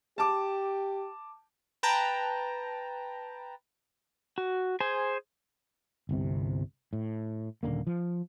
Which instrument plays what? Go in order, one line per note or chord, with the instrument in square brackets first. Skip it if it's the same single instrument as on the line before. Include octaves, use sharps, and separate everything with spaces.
[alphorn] G4 [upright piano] A5 D6
[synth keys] B4 G5 A5 A#5
[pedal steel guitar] F#4
G#4 C5 G#5
[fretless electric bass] G1 C2 C3
A2
D#1 D3 A#3
F3